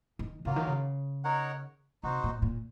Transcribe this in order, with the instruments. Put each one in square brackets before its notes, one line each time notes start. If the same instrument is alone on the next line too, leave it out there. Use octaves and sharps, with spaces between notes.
[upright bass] D#3
[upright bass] C#3 [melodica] F#3 A#3 F4
[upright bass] D#3
C#3
[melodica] D#4 A#4 C#5 F#5
[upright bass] C3 [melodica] D#4 F#4 C5
[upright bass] A#2
A#2